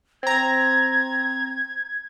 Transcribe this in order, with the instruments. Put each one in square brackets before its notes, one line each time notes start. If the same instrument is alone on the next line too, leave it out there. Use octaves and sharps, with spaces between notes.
[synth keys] C4 A#5 [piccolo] G#6